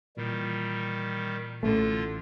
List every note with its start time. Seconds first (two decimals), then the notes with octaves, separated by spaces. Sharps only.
0.17 A#2 D#3 E3 G3
1.63 A1 D3 A3 F4